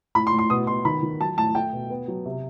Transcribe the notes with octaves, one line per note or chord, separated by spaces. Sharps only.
A2 B5
C6
A2
C6
B2 D#6
B2 C6
D#3 B5
D#3
F#3 A5
A2 A5
A3 G5
B2
B3
F#3
C3